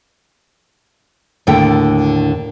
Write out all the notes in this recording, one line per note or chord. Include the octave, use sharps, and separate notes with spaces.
D#2 A2 D3 A4 G5